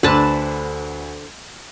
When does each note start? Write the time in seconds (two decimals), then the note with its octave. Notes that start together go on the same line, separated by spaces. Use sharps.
0.03 D2 D3 D4 B4 C5 A5